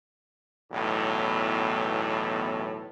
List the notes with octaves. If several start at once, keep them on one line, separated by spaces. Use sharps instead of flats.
B1 E2 A2